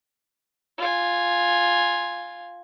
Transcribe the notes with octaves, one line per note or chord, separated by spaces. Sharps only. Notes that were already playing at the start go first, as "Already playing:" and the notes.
F4 G#5